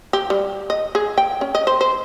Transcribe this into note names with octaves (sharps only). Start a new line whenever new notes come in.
G4
G3
D#5
G#4
G5
C#4
D#5
C5
C5